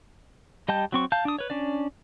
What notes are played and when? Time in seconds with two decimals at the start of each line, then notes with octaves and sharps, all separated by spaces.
0.68 G3 D#5 G5 A5 G6
0.92 F#3 C4 C#6
1.12 F5 A5 G6
1.25 D4 D#6
1.39 B4 C#5
1.50 C#4 D4 D5